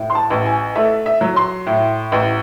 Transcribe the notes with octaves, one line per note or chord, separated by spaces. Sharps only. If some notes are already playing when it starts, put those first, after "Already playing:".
Already playing: A2
C6
A5
A1
G#5
A3 E5
E5
F#3
C6
A2
A1